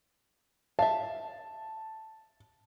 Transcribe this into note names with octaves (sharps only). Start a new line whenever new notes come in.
E5 F5 A5